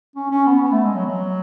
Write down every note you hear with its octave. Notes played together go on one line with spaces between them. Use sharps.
C#4
C#4
B3
B3
A3
G#3
F#3
F#3